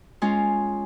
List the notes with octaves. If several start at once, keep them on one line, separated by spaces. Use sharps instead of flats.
G#3 C#4 F4